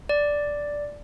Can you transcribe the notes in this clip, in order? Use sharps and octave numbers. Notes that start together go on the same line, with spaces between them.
D5